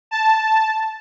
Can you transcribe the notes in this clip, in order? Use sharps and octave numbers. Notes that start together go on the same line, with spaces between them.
A5